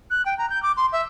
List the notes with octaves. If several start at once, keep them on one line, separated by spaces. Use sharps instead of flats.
F#6
G5
A#5
G6
D6
C6
E5